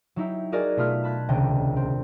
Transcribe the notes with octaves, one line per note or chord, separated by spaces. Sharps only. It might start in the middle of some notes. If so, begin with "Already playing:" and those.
F#3 D#4 E4 G4
F#4 G#4 A#4 D5 D#5 G#5
B2 A3 F4 B5 D#6 F6
A5 B5 F#6 G#6
D#1 C#2 C3 D4 D#5 G5
C4